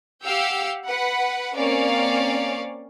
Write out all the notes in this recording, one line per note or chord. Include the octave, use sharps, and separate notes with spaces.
G4 F5 F#5 E6 G6
B4 F#5 B5
A#3 C4 C#4 C#5 D5 F5